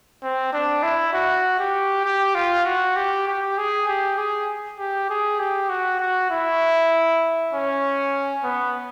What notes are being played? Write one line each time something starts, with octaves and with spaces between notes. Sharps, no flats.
C4
D4
E4
F#4
G4
G4
F4
F#4
G4
G4
G#4
G4
G#4
G4
G#4
G4
F#4
F#4
E4
C#4
B3